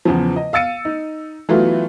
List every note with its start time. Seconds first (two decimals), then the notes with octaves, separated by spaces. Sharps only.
0.05 E2 C#3 F3
0.36 D#5
0.53 F5 E6 A6 C#7 D#7
0.85 D#4
1.49 E3 F#3 A3 B3 F4 F#4